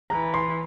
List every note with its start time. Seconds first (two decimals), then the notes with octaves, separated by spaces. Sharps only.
0.10 E3 A#5
0.34 C6